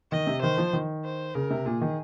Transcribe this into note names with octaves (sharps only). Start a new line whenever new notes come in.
D#3 D#5
C3
D#3 C5
F3
D#3
C5
C#3 A#4
C3
A#2 G#4
D#3